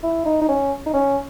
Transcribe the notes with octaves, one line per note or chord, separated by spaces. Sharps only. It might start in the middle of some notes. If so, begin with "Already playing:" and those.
E4
D#4
D#4
C#4
D#4
C#4